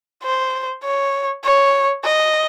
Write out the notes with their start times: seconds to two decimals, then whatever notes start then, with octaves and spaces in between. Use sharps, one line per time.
0.24 C5
0.84 C#5
1.44 C#5
2.04 D#5